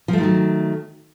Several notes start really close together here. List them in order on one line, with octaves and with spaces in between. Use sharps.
F3 A3 D#3 F#3